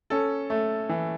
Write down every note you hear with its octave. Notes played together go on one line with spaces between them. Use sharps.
C#4 A4
A3
E3